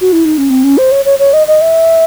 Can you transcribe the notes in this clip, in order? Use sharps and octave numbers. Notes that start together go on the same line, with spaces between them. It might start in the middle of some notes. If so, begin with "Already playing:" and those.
F#4
E4
D#4
C#4
C4
C#4
C5
C#5
C#5
C#5
D#5
D#5
E5